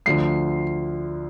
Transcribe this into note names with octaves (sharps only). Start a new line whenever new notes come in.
D2 D3 F3 C7